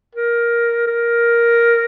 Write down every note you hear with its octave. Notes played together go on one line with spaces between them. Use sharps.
A#4
A#4